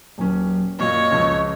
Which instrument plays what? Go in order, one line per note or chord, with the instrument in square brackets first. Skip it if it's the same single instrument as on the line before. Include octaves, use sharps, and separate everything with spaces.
[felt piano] D#1 C#4 [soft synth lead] F#3
[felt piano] F#2 A#2 [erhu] C#5 [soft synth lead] D#5
[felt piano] C#2 F3 G#4